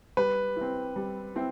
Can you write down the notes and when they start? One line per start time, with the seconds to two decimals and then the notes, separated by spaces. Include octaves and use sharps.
0.17 G3 B4
0.56 C4 E4
0.96 G3
1.36 C4 E4